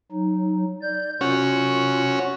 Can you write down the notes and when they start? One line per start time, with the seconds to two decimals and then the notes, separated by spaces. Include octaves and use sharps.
0.12 F#3 D#4
0.82 D5 G6
1.21 C3 C#4 F4 F#4